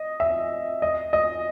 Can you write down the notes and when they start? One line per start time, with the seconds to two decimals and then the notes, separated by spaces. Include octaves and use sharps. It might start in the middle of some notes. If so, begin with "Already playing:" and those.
Already playing: D#5
0.20 E5
0.82 D#5
1.13 D#5